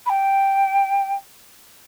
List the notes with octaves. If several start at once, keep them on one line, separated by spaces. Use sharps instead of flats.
B5
G5